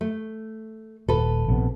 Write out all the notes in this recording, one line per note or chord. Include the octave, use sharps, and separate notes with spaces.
A3
D#1 A4 B4
A#1 C3 B3